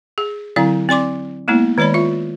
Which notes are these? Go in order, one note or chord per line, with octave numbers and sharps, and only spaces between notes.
G#4
D3 F#3 C4 E4 F5
C4 D5 C6 D6
G#3 A#3 B3 E4
D#3 G#3 C#5 D5 B5
F4 E5